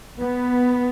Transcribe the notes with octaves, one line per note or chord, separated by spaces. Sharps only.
B3